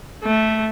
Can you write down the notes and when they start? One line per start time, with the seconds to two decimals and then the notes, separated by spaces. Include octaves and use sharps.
0.24 A3